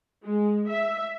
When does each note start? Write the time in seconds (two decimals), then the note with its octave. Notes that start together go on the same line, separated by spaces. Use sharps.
0.24 G#3
0.68 E5